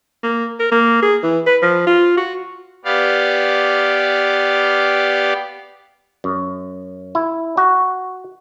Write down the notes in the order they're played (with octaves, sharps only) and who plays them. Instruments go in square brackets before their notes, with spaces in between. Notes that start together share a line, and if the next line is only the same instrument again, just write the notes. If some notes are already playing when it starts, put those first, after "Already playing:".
[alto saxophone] A#3
A#4
A#3
G#4
E3
B4
F3
F4
F#4
[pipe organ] B3 G4 D5 F5
[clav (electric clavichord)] F#2
E4
F#4